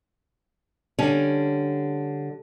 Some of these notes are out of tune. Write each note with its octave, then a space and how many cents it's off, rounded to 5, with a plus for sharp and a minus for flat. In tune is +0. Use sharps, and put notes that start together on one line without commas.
D3 +0 G3 +0 C#4 +0